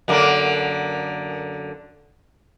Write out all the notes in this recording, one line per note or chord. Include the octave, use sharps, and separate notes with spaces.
F#2 D3 A#3